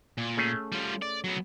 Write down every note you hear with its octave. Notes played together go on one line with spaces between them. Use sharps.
A#2
A3 C#4 G#4
G3 F4
D5
F#3 B3